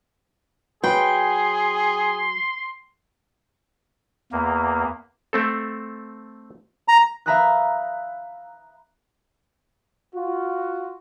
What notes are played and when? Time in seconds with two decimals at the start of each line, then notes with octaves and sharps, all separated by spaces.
0.84 F#3 G#4 B4 G5 C6
4.32 E2 A#3
5.33 A3 C4 A4
6.88 A#5
7.26 E5 F5 A#5 B5 D#6 F#6
10.15 F4 F#4